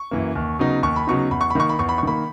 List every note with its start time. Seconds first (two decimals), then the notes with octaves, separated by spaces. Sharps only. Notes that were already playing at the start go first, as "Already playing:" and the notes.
Already playing: C#6
0.11 F#2 E3 A#3
0.35 D#2
0.59 C#3 F#3 B3 D#4
0.83 D#2 C#6
0.96 B5
1.07 C#3 F#3 B3 D#4 C#6
1.31 E2 B5
1.41 C#6
1.50 B5
1.55 D#3 A#3 C#6
1.69 B5
1.79 E2 C#6
1.89 B5
1.98 C#6
2.03 D#3 A#3 B5